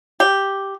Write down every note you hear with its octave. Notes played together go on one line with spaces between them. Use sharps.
G4